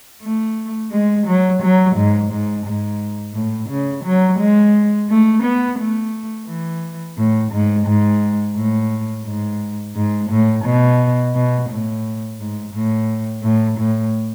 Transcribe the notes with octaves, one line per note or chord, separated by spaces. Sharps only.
A3
G#3
F#3
F#3
G#2
G#2
G#2
A2
C#3
F#3
G#3
A3
B3
A3
E3
A2
G#2
G#2
A2
G#2
G#2
A2
B2
B2
A2
G#2
A2
A2
A2